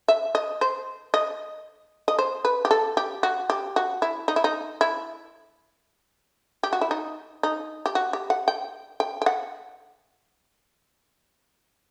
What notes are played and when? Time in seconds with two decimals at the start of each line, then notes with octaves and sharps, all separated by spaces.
0.08 E5
0.35 D#5
0.61 C5
1.14 D#5
2.08 D#5
2.19 C5
2.45 B4
2.65 G4
2.71 A4
2.97 G4
3.23 F#4
3.50 G4
3.76 F#4
4.02 E4
4.28 D#4
4.36 E4
4.44 D#4
4.81 E4
6.63 G4
6.73 F#4
6.81 E4
6.91 D#4
7.43 D#4
7.86 G4
7.95 F#4
8.13 G4
8.30 F#5
8.48 G5
9.00 G5
9.22 G5
9.26 F#5